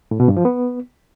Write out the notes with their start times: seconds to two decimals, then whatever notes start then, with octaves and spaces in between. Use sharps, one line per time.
0.11 A2
0.20 B2
0.28 G2
0.37 F3
0.45 B3